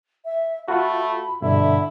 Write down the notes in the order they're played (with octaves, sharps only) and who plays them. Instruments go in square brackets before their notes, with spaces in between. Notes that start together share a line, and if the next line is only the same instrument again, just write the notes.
[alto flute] E5
[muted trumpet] A3 [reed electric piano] F4 F#4 [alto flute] B5
[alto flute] B5
[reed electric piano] G2 B2 [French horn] D3 [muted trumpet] E4 [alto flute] E5